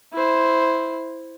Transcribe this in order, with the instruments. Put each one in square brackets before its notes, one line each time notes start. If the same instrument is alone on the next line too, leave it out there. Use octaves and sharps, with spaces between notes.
[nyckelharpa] E4 C5